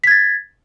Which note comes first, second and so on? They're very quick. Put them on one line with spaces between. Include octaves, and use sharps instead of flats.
B6 G#6 A6